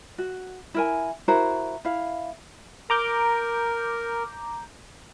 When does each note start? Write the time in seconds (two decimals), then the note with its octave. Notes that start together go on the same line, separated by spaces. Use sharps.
0.18 F#4
0.74 E4 A#4 G#5
1.28 E4 F#4 A#4 C5
1.85 E4 F5
2.90 A#4 A#5 D6 G6